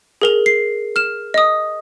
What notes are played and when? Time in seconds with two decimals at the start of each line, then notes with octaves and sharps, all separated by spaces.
0.22 G#4 A#4 F7
0.46 C7
0.96 F6 E7
1.34 D#5 D#6